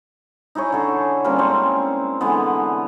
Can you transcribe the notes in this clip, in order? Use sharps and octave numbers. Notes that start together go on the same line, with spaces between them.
D#4 E4 G#4 C#5
D3 G#4 A4
G3 A#3 C4 C#4
G#3 C4 C#6
D3 E3 G#3 B3